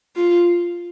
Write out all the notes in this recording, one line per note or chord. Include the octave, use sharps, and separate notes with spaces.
F4